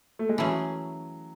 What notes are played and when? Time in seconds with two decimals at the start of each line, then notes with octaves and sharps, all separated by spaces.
0.19 A3
0.29 G#3
0.38 E3 F#3 A3 C#4 G#4